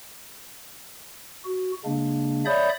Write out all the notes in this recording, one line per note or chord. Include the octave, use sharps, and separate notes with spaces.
F#4
C#3 G#3 A#3 D4
C#5 D5 E5 B5 D#6 G6